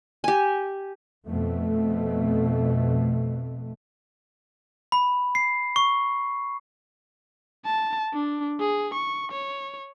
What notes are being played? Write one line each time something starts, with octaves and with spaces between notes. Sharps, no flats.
G4 G#5
F2 B2 A3
B5
C7
C#6
A5
D4
G#4
C#6
C#5